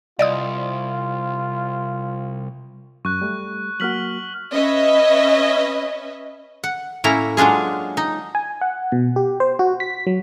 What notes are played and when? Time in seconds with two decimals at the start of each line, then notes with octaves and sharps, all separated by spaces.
0.19 C2 F4 D5 D#5 D#6
3.05 F#2 C#6 F#6
3.22 G3 A3
3.80 F#3 A#3 F#4 F6 B6 F#7
4.53 C#4 B4 D#5 E5
6.64 F#5
7.04 A2 A#3 C#4 E4 A#5
7.37 F#3 G#3 D4 F4 G#4
7.97 D#4
8.35 G#5
8.62 F#5
8.92 B2
9.16 G4
9.40 C5
9.59 F#4
9.80 B6
10.07 F#3